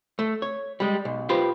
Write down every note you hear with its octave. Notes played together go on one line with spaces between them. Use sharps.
A3
C#5
G3 G#3
B1
F4 G4 B4 C5